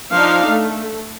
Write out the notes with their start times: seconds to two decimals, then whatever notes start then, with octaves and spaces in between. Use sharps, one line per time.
0.14 F3 D4 D#4 F5
0.48 A3